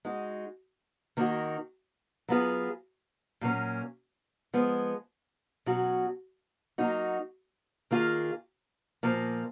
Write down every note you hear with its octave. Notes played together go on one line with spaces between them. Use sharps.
G#3 D#4 F#4
D#3 A#3 D#4 F#4
F#3 B3 F4 G#4
A#2 F#3 A#3 C#4
F3 G#3 B3
B2 F#3 C#4 F#4
F#3 A#3 D#4 F#4
D#3 A#3 F4 G#4
A#2 F3 A#3